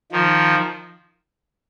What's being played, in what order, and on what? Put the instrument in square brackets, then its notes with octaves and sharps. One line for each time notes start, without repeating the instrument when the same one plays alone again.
[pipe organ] D#3 F3